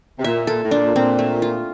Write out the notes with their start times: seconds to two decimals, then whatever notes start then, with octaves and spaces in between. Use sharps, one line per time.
0.18 C3
0.24 A#2 E5
0.47 A#2 A4
0.63 A2
0.71 A#2 D4
0.95 A#2 C4
1.19 A3
1.42 F4